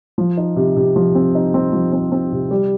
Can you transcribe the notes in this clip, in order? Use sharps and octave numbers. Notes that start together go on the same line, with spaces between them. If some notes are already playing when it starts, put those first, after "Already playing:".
F3
D#4
C3
C3
F3
C4
D#4
C4
F3
C4
C4
C3
G3